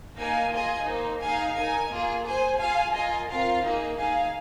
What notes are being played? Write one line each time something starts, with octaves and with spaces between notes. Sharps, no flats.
A#3 D#4 A#4 F5 G#5
F4 G#4 D#5 G#5
A#3 D#4 C5
D#4 G#4 F5 G#5
D#4 A#4 G#5
A#3 F4 G#4
G#4 C5 G#5
F4 G#4 F5 G#5
F4 A#4 D#5 G#5
C4 F4 A#4 F5
A#3 D#4 G#4
D#4 G#4 F5 G#5